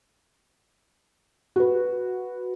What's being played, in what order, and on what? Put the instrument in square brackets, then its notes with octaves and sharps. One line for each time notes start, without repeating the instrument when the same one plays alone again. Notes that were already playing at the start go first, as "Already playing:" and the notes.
[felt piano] F#4 B4